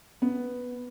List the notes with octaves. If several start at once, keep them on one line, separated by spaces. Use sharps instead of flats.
B3